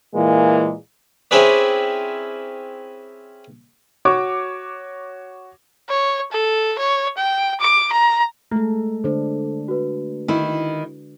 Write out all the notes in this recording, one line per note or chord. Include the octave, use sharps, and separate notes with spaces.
A#2 E3 G#3 A#3
C4 C#4 E4 G#4 B4 D5
F#4 C#5 C#6 D6
C#5
A4
C#5
G5
D6
A#5
G#3 A3 A4 A#5
D3 D4 A4 C5
F#4 B4
D#3 E4